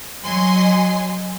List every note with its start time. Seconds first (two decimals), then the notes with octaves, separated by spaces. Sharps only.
0.25 F#3 D#5 G#5 C6